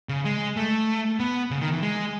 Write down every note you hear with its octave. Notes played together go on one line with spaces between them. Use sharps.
C#3
G#3
A3
B3
C#3
D#3
E3
G#3